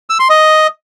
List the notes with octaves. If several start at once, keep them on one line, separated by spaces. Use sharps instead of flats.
E6
C6
D#5